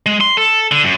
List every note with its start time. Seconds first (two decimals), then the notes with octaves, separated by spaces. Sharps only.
0.06 G#3
0.21 C6
0.37 A4
0.71 D3
0.84 F#2